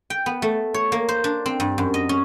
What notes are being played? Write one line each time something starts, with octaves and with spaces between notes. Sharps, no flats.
G5
B3
A3
C#5
A#3
C5
D4
C4
G2
F#2
D#5
C#4